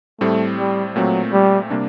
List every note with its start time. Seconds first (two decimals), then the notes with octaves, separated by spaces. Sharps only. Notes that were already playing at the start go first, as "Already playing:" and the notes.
0.20 A2 G3 A3 C4
0.58 G3
0.95 A#2 F#3 A3 C4
1.33 G3
1.70 C3 G3 A#3 D4